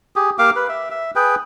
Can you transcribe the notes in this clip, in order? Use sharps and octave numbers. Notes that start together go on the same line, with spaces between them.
G4 G#4
A#3 G4 F5 D6
B4
E5
E5
G#4 B4 G5